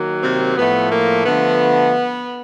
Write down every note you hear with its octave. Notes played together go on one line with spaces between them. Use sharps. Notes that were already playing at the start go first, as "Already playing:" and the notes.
Already playing: D#3 F#3 A#3
C3 C4
A2 F3 A3 B3
A#3
D3 F3 A3 B3